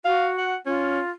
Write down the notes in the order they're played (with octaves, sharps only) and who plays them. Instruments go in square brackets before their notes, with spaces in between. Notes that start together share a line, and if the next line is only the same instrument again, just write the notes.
[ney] F#4 [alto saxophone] F5
[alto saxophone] F#5
[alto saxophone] C#4 [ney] F4